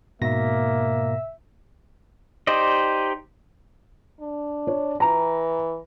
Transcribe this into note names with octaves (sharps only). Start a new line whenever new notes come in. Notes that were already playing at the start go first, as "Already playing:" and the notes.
G#2 B2 A#3 E5 A#6
D#4 G4 C5 D5 D#5
D4
C#5
E3 A#5